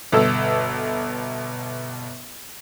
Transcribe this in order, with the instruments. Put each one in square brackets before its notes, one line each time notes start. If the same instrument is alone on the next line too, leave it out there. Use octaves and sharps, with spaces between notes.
[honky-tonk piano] G1 B2 A4 E6